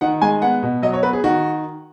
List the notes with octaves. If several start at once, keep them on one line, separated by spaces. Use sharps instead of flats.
D#3 F#5
G#3 G#5
B3 F#5
B2
F#3 D#5
C#5
B3 B4
G#4
D#3 F#4